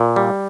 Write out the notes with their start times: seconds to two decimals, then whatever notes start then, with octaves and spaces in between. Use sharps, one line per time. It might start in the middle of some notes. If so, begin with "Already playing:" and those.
Already playing: A#2
0.16 G3